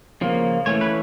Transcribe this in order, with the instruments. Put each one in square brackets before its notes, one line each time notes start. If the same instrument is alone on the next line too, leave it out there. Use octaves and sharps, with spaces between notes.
[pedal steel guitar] C#3 F3 A#3
E3 A3 C#4 C#5
B4